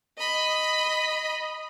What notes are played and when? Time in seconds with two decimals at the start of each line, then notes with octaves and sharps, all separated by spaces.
0.18 D#5 B5